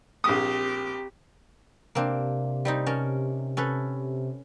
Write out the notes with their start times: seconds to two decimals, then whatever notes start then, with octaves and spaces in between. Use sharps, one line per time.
0.24 A#1 C4 G4 D#6
1.95 C3 A#3 C4 D4
2.65 G3 C4 D#4
2.86 C#4 A#4 A5
3.57 C#4 A4 B4